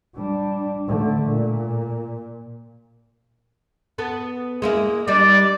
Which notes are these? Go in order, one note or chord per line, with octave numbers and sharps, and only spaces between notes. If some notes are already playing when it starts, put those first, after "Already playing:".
G3 D4
D3 A3
A#2
B3 A4 B4
G#3 A#3 E4
G3 D4 D#4 D5